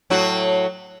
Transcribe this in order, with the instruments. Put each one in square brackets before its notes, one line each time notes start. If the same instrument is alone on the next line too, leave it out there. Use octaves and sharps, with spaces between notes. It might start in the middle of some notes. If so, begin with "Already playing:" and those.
[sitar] A2 F#3 F#4